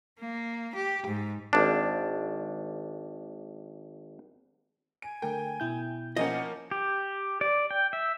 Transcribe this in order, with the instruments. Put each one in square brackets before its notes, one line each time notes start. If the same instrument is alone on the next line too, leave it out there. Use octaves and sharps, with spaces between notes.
[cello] A#3
G4
G#2
[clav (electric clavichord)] G#1 D4
[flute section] G#5 [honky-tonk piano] D7
[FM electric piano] D3 A3 A#4 [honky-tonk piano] G5
[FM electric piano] B2 E4 G6
[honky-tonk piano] F3 A#3 C#4 [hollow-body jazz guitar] D#5 [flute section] F#5 G#5 D6
[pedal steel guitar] G4
D5
G5
E5